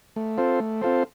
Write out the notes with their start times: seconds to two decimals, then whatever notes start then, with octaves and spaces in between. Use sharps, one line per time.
0.16 A3
0.38 C4 F4 A4 C5
0.60 A3
0.82 C4 F4 A4 C5